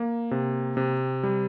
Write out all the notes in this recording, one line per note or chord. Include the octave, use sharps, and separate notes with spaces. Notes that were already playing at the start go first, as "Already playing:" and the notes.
Already playing: A#3
C3
C3
G3